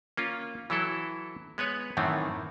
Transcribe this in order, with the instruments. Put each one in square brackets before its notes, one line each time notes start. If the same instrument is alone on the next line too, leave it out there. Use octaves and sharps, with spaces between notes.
[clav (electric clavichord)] A#3 C#4 F4
E3 F#3 E4 A4
G#3 B3 B4 C#5
F#2 A2 D#3 E3 A3 C4